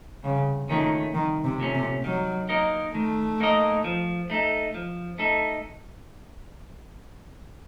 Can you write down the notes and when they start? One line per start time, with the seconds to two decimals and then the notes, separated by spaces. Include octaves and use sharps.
0.24 C2 C#3
0.69 A#2 D#3 A3 C#4
1.14 C2 D#3
1.44 C3
1.60 A#2 A3 C#4
1.74 C3
2.04 D#3 F#3
2.49 A#3 D#4 A#4 D#5
2.94 D#3 A3
3.40 A#3 D#4 A#4 D#5
3.84 F3
4.30 A3 D#4 A4
4.74 F3
5.18 A3 D#4 A4